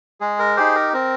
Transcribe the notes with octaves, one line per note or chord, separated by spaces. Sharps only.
G#3 G#4
A#4
D#4 G4 G#4 C5
A#4
C4 A#4